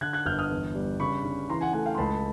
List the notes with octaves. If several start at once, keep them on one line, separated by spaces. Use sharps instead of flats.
D3 F#6 G#6
F#6 G#6
G1 F6 G6
D#6 F6
E2
G3
C#3 B5 C#6
C#3
E3 A#5 C6
F#5 G#5
A3 F#5 G#5
F5 G5
C6
C#2 A5 B5